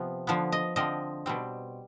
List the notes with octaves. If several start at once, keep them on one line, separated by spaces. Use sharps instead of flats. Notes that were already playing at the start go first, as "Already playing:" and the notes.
Already playing: C3 F3 B3
D3 F3 B3
D#5
D3 F3 C4 D#5
B2 G3 C4